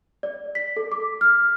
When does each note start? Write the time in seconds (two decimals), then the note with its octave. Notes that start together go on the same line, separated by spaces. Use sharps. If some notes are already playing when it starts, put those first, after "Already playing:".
0.23 D5
0.55 B6
0.77 A4
0.92 D6
1.21 F6